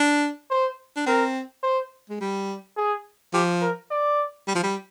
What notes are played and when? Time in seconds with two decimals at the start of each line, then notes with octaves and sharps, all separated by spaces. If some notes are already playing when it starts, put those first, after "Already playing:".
Already playing: D4
0.50 C5
0.96 D4
1.07 C4 A#4
1.63 C5
2.10 G#3
2.21 G3
2.77 G#4
3.34 F3 G4
3.62 A#4
3.91 D5
4.48 G3
4.55 F3
4.63 G3